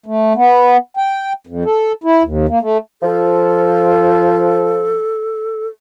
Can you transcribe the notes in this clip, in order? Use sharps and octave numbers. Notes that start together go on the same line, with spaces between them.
A3
B3
G5
F2
A4
E4
D#2
A#3
A3
F3 A4